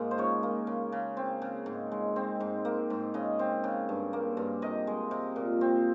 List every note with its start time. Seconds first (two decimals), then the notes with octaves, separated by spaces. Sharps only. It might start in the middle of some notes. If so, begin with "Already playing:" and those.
Already playing: G#2 A#3 F4 G#4 A#4
0.11 C5
0.18 C#3 C#5
0.43 A#3
0.67 C#3
0.92 C#3
1.17 C4
1.42 C#3
1.66 G#2
1.92 G#3
2.16 C4
2.40 G#2
2.65 A#3
2.90 G#2
3.14 C#3 D#5
3.39 C4
3.64 C#3
3.89 G2
4.13 A#3
4.37 G2
4.62 C3 D#5
4.87 G#3
5.11 C3
5.36 A#2
5.61 C4